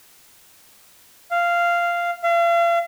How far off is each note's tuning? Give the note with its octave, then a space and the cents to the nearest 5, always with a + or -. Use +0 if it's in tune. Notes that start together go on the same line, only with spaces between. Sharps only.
F5 -10
F5 -40